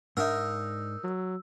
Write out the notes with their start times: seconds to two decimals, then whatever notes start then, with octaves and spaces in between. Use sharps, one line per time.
0.17 G#2 D4 D#4 A#4 E5 E6
1.04 F#3